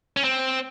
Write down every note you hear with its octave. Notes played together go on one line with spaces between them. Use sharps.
C#4
C4